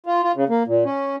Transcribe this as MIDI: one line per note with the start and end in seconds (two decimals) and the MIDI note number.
0.06 0.22 65
0.23 0.32 65
0.36 0.44 49
0.49 0.63 58
0.67 0.84 46
0.85 1.16 61